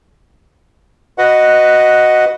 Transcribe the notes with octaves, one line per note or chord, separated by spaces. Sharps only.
F#4 B4 D#5 F#5